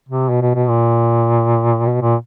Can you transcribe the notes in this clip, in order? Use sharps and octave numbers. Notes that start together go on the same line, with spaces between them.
C3
B2
B2
B2
A#2
B2
A#2